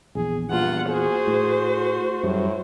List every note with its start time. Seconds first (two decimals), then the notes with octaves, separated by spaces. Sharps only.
0.15 A#1 E2 G#4
0.49 E2 G2 A#2 F4 F#5
0.90 F#4 G#4 C5
1.27 A2
2.23 F#2 A2 G3